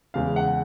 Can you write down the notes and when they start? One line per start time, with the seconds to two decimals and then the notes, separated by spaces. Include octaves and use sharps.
0.14 E2 C#3 E3 G#3 F5
0.36 F#5